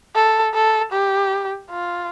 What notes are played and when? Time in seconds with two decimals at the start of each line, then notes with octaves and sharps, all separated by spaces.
0.15 A4
0.54 A4
0.93 G4
1.71 F4